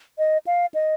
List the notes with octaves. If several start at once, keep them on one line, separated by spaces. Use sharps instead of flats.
D#5
F5
D#5